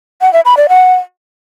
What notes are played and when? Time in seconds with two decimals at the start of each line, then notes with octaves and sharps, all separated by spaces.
0.21 F#5
0.33 E5
0.45 B5
0.57 D5
0.69 F#5